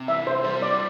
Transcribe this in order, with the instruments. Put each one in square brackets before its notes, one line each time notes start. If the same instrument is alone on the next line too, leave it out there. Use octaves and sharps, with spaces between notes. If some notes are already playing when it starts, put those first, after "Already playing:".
Already playing: [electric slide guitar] C3
[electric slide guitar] E3 [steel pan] E5
[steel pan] C5
[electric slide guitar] G3 [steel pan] C5
[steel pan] D5